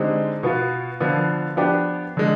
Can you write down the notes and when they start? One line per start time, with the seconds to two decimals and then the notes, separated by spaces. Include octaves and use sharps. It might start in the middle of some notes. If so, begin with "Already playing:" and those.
Already playing: D3 G#3 C4 D#4 G4
0.43 B2 B3 F4
1.00 D3 F3 B3 F4
1.57 F3 B3 D4 G4
2.17 D3 G#3